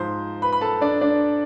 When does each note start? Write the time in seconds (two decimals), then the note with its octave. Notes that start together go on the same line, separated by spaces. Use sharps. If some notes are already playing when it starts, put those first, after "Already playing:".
Already playing: G#2 F3 C5 C6
0.42 B4 B5
0.53 B5
0.61 A4 A5
0.81 D4 D5
1.01 D4 D5